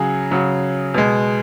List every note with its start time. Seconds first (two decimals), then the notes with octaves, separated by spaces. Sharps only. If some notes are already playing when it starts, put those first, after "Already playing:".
Already playing: C#3 F#3 G#4
0.31 C#3 F#3
0.94 B2 G#3